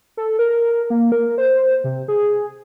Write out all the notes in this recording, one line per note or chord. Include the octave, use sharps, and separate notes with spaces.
A4
A#4
A#3
A#4
C5
C3
G#4